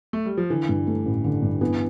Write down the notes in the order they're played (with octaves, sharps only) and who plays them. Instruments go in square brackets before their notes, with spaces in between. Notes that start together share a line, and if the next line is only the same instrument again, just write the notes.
[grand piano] A3
G3
F3
[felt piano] D3 [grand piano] E3
[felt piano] G2
A3
A1
D3
G2
[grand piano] E3 [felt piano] B3